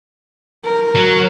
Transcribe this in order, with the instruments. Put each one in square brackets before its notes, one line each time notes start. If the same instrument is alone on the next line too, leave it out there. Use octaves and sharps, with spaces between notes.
[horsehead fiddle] A#4
[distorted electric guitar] F#3